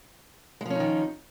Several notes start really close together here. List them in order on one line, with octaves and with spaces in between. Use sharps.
G#3 F3 C#4 D#4 D#3